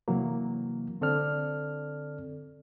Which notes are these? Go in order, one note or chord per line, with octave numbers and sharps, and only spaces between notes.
C3 E3 F#3 A#3
D3 C4 A4 D5 F6